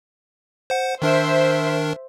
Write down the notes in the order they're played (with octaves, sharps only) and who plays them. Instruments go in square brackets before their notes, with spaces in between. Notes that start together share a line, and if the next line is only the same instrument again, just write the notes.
[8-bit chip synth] C5 F#5
[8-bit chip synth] D#3 D4 A#4 [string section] C5 E5